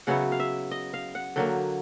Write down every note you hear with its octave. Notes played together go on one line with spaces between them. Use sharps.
C#3 F#3 B3 E4 F#5
F5
E5
D#5
F5
F#5
D3 F#3 A#3 G5